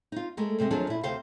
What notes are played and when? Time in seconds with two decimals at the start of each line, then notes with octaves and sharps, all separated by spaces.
0.12 D#4 F4
0.37 G#3 A3 A#4
0.59 D2 C3 G#3 D#5
0.71 D#2 F3 F#3 D4 G#4
0.87 A#2 E4
1.03 D2 C3 G4 C5 F5